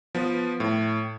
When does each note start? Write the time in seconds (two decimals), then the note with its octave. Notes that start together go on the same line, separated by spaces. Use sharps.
0.15 F3 B3
0.60 A2